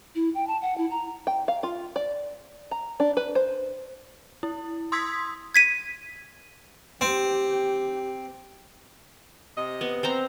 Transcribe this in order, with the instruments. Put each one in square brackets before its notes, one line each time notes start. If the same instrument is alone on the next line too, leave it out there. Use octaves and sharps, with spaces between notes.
[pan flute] E4
G5
A5
F#5
E4
A#5
[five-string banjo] G5
F5
F4
D5
A#5
D4
B4
C5
[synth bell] E4
C6 D#6 E6 G#6 B6
[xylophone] G#6 B6 D#7
[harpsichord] C4 [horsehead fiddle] G4
[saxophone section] C3 D#5
[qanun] B3
C4 C5 A#5